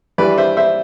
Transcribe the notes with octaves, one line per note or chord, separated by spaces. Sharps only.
G2 E3 G3 B4 D5
C5 E5
C5 E5